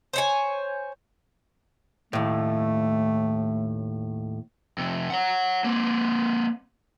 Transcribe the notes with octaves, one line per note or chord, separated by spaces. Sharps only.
C5 C#5 G#5
D#2 A2 A3
F2 C3
C#5 F#5
A#3 C4